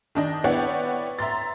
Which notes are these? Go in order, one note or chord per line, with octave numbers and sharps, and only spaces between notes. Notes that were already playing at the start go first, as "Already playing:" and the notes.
D#3 D4 D#5
B3 E4 C#5 D5 F#5 G5
E5 A#5 C6 A6